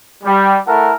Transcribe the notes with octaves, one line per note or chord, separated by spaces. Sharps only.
G3
A3 E4 A4 A#4 F#5